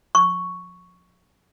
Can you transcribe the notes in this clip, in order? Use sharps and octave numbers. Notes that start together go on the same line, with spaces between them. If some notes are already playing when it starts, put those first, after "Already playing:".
C#6